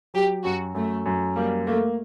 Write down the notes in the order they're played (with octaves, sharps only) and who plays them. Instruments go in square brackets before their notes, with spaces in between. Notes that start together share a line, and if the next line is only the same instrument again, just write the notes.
[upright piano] F#3 [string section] G4
[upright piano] F#2 [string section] F#4
[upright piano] F#2 [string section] A3
[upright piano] F#2
[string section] G3 [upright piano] A#3
[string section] A3 [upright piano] A#3